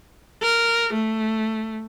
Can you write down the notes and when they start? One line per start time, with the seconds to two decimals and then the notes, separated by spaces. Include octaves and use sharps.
0.42 A#4
0.93 A3